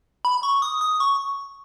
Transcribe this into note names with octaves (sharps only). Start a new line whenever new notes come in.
B5
C#6
D#6
D#6
C#6